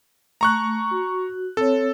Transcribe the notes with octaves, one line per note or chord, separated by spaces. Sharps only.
A3 A#5 C#6 F#6
F#4
C4 A4 C#5